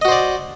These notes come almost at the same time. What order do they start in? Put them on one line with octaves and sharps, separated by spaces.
D#5 F#4 C5 D5